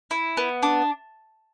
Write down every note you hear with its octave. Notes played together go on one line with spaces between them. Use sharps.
E4
B3
D4